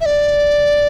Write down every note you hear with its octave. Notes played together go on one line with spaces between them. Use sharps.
E5
D5